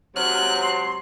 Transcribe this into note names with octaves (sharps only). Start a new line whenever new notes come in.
G#2 C3 F#3 F6 F#6
C6